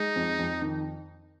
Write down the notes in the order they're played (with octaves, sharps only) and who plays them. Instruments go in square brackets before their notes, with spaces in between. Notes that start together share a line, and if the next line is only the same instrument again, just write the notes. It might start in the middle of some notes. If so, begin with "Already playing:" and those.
Already playing: [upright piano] G#3 [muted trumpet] D#4
[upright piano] F2
F2
D#3